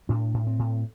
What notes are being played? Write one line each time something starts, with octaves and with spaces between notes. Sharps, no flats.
A2 D4
A2
C4
A2